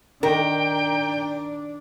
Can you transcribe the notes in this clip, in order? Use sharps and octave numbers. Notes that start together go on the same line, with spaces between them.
D#3 D4 A#4 G5